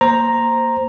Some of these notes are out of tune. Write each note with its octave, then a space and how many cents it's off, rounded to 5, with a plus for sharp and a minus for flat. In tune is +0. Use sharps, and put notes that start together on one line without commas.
A#3 +0 C5 +0 A#5 +0